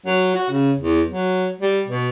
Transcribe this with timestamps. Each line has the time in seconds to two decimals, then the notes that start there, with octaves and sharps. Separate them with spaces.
0.06 F#3
0.36 F#4
0.50 C#3
0.80 E2
1.09 F#3
1.61 G3
1.88 B2